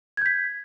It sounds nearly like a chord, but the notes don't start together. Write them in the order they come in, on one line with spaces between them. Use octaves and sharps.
G#6 G6 B6